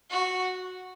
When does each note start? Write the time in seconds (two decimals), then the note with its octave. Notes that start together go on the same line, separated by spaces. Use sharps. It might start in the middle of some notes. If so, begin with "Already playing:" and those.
0.10 F#4